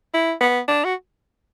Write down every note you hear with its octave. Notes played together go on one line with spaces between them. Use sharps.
E4
B3
D4
F#4